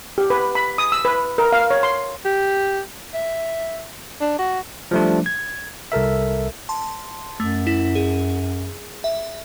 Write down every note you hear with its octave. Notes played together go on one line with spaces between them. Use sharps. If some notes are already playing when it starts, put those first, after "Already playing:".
G4
B4
B5
D#6
E6
B4
A#4
F5
C#5
C6
G4
E5
D4
F#4
F3 G3 A3 D4
G#6
C2 A4 A#4 E5
A5 C6
F#2 A3
E4
G#4
E5